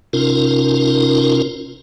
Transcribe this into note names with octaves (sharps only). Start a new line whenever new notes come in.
C3 C#4 D#4 F4 A#4